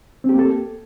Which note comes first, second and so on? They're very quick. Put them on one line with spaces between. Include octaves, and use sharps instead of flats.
C4 G4 A#3 A4